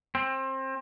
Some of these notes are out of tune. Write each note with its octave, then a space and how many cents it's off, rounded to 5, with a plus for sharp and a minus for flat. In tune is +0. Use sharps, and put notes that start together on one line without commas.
C4 +25